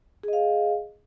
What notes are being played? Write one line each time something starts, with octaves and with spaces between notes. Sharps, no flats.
G#4 D#5 F5